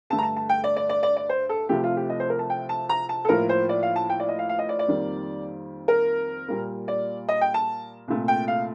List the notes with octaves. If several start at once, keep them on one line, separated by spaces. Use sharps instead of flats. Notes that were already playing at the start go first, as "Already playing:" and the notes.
G2 D3 A3 A5
A#5
A5
A5
G5
D5
D5
D5
D5
D5
C5
A4
C2 C3 F3 A3 G4
F4
G4
D#5
C5
A#4
A5
G5
A5
A#5
A5
A4
A2 F3 A#3 A#4
C5
D5
F5
A5
G5
D5
D#5
F5
F5
D#5
D5
D5
F2 D#3 G3 A#3
A#4
A#2 G3 A#3
D5
D#5
G5
A5
C2 A#2 A3
G5
F5